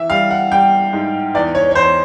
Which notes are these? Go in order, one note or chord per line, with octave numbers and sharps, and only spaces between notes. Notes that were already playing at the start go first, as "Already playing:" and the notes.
Already playing: E3 E5
G3 F5
F#5
G3 G5
G#2
E2 D5
C#5
C#5
E2 C5